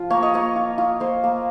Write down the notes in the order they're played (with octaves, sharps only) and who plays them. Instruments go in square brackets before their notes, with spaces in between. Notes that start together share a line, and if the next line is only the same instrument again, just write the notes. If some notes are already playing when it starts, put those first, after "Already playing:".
Already playing: [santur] F3 F4
A#3 C#5
D#5
A#3 C#5
F4
F4
A#3 C5
A#3